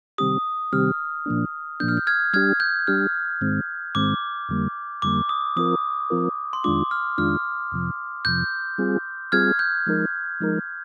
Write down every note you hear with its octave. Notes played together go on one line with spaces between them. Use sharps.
C3 D#3 G3 C4 G4 D#6
C3 D#3 G3 C4 G4 F6
A#2 F3 A#3 D4
A#2 F3 A#3 D4 G6
F6
G6
F6 G#6
G3 D4 G4 F6 G#6
G6
G3 D4 G4 F6
G#2 D#3 G#3 C4
G#2 D#3 G#3 C4 D6
F2 D3 G3 A#3
F2 D3 G3 A#3 D6
D#6
F3 C4 F4 A#4 D#6
F3 C4 F4 A#4
C6
F2 D#3 G#3 D4 F4 D6
F6
F2 D#3 G#3 D4 F4 F6
F2 C3 F3
F2 C3 F3 G6
G3 C4 F4 G#4
G3 C4 F4 G#4 F6 G#6
G6
F3 G#3 D#4 A#4
F3 G#3 D#4 A#4